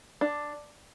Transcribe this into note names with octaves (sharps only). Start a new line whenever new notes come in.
D4